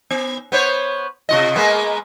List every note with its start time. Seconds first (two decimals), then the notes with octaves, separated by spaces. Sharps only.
0.11 B3
0.52 B3 C5 C#5
1.29 C3 F4 D#5
1.56 G#3 A#3 B3